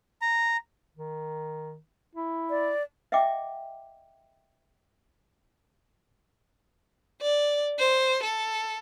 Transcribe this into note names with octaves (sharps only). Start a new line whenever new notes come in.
A#5
D#3
E4
D5
D#5 E5 F#5 G5 D6
D5
C5
A4